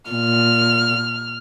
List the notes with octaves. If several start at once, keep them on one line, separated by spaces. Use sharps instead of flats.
A#2 F6